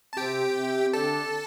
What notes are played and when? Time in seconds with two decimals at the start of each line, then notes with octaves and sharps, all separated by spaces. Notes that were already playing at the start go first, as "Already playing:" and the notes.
0.13 A5
0.17 C3 C4 G4 G5
0.55 C3 C4
0.93 D3 D4 A4 A5